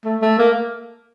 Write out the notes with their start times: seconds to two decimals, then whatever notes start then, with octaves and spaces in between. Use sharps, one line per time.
0.05 A3
0.22 A3
0.39 A#3